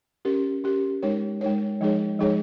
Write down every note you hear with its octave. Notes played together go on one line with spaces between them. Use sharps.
C#4 G4 A#4
C#4 G4 A#4
G#3 D#4 A#4 C#5
G#3 D#4 A#4 C#5
F3 G#3 D#4 G#4 C#5
F3 G#3 D#4 G#4 C#5